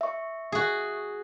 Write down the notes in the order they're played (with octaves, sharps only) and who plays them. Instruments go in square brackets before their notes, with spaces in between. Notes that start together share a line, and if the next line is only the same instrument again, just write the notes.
[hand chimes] E5 C#6
[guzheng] F#4 G#4